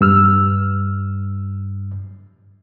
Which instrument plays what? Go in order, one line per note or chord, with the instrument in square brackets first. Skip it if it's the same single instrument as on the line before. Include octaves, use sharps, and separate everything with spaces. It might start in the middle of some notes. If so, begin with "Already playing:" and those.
[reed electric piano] G2 E6 F6